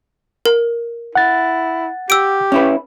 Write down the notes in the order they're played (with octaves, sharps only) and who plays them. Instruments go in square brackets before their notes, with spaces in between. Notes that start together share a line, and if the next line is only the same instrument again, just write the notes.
[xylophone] A#4
[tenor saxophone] E4 [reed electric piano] F#5 A6
[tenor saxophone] G4 [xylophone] E6 D7
[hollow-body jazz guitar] C#4 E4 B4